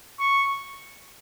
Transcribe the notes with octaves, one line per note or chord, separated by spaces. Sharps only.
C#6